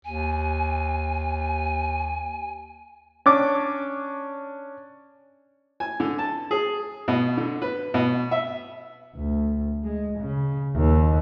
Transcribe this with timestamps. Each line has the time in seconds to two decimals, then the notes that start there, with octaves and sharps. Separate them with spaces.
0.05 D#2 G#5
3.26 C#4 D4 D6
5.80 G#5
6.00 D3
6.18 A5
6.51 G#4
7.08 B2
7.37 D3
7.62 B4
7.94 B2
8.31 E5
9.16 D2
9.83 G#3
10.19 C#3
10.75 D#2